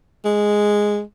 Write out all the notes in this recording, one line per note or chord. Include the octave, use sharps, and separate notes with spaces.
G#3